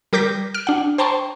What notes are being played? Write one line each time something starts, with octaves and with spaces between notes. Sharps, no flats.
G3 A#4 D6 G6 A#6 B6
F6 D7
D4 F#5
C5 G5 A5 A#5 C6 C#6